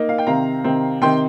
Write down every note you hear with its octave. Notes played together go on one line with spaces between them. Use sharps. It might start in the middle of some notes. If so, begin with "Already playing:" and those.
Already playing: A#3 D#4
F5
G5
C3 D#3 C4 F5 A#5
C3 D#3 C4
C3 D#3 C4 G5 C6